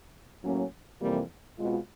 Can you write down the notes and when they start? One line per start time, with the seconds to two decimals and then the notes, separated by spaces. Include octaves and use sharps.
0.43 A2 F#3 A#3 C#4
1.01 F2 C3 E3 G3 A#3
1.58 B2 G#3 C4 F4